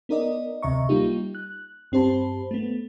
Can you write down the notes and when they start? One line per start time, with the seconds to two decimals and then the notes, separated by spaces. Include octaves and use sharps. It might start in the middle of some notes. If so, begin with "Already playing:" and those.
0.09 B3 D#4 A#4 D5 D#5
0.63 D2 C3 D#5 E5 A#5 C#6
0.89 G3 A#3 D#4 F4 G4
1.35 F#6
1.92 G2 C4 G4 C5 A5 B5
2.51 A3 B3